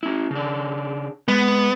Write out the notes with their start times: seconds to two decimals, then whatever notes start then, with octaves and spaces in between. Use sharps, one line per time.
0.03 C#4 E4
0.31 C#3 D4
1.28 G#3 B3